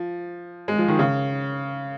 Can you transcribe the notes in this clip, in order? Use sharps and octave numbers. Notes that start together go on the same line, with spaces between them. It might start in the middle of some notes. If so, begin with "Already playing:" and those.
Already playing: F3
G#3
F3
D#3
C#3